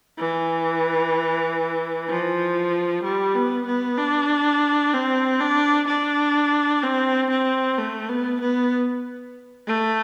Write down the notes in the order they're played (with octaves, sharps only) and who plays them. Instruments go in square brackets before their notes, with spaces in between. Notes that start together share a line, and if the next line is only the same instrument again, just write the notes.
[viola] E3
F3
G3
B3
B3
D4
C4
D4
D4
C4
C4
A3
B3
B3
A3